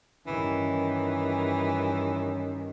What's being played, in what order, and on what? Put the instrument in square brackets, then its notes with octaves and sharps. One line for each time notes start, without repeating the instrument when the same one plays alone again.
[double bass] G2 D#3 [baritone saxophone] E3 [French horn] C#4